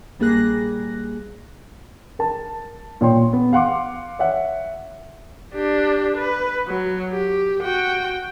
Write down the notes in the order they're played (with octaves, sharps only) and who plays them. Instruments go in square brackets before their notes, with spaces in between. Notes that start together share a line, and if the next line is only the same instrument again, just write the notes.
[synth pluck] A#1 G3 A#3 G#4 F#6 A#6
[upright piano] A#4 A5
A#2 C#5 G5 C6
B3
F5 F#5 C6 D6
C#5 E5 F#5
[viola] D4 G4
B4
F#3
G4
F#4 G5